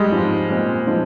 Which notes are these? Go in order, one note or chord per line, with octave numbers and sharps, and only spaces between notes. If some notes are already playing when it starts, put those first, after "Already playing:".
Already playing: G3 G#3
G#2 F3 C4 F4
A#2 G#3 C4
F3 G#3 C4